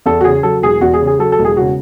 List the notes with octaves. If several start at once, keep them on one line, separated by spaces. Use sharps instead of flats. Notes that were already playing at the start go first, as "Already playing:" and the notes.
E2 A4
F#4
C#3 G#4
F#3 A4
E1 G#4
E2 F#4
G#4
C#3
G#4
F#3 A4
A4
E1
G#4
C#3 F#4